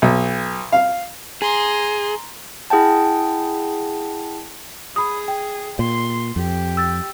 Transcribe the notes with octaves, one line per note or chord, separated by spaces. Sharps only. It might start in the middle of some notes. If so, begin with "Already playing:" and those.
B1
F5
G#4 A#5 C6
E4 G#4 F#5 G5 A5
G#4 B5 D#6
G5
A#2 C6
F2 G4
E6 A6